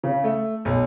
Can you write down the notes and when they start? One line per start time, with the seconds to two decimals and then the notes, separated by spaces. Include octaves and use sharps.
0.04 C#3
0.24 A3
0.65 B1